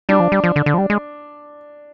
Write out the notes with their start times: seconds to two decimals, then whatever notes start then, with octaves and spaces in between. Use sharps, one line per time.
0.09 G3 D4
0.20 F3
0.32 G3
0.44 F3
0.56 D3
0.66 D3
0.74 F3
0.78 G3
0.90 G#3